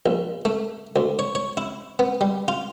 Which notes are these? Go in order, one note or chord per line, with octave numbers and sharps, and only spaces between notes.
A#1
A3
D2
C#5
C#5
E4
B3
G3
F4